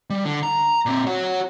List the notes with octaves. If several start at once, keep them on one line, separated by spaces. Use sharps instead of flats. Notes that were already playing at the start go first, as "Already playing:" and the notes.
G3
D3
A#5
A#2 C4
F#4 C#5